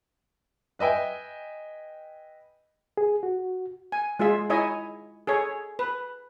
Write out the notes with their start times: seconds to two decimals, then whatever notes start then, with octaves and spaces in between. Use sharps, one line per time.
0.79 B4 D#5 E5 G5 G#5
2.97 G#4
3.23 F#4
3.92 G#5
4.19 G#3 F4 G#4 E5
4.50 D#4 E4 C#5 D#5 E5 G#5
5.27 G#4 A4 C#5
5.79 B4